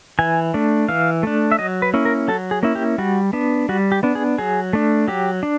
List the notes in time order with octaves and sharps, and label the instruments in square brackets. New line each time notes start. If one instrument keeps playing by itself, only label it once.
[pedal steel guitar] E3 G#5
A3 D4
E3 F5
A3 D4
E5
F#3 D#5
B4
A#3 C#4 E4
A#4
F#3 A4
G#4
A#3 C#4 E4
G4
G3 F#4
B3 D4
G3 F#4
G4
B3 D4
G#4
F#3 G#4
A3 D4
F#3 G4
D4